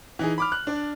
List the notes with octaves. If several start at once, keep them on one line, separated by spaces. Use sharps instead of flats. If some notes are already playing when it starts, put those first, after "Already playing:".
E3 D#4 G#4
B5 D6 F6
F#6
D4 D5